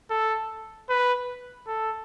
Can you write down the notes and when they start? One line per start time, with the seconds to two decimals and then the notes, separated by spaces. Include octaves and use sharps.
0.10 A4
0.89 B4
1.67 A4